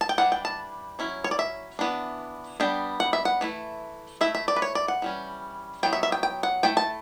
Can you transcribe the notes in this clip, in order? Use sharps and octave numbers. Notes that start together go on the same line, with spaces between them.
A5
G5
E3 G3 D4 F#5
G5
A5
F#3 C#4 E4
C#5
D5
E5
E3 B3 D4
G3 B3 D4 G5
F#5
E5
F#5
E3 A3 E4
A3 E4 E5
E5
D5
B4
C#5
D5
F#5
E3 G3 C#4
F#3 B3 E4 G5
E5
E5
G5
G5
F#5
A3 E4 G5
A5